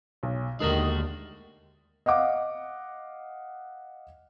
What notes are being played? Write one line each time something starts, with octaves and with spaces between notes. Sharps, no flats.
B1
D#2 D3 D#3 G#3 A3 F#4 A#4 D#5
D#5 F5 F#5 D6